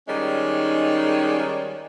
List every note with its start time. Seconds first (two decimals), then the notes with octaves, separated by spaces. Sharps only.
0.08 D#3 G3 G#3 C#4 D#4